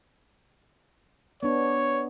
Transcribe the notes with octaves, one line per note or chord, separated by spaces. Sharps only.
B3 D4 C#5